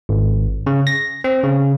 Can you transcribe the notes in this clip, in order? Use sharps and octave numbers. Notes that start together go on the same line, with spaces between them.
G#1
C#3
A#6
C4
C#3